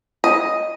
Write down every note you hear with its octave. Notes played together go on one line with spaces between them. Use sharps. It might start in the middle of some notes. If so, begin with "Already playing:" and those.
D#5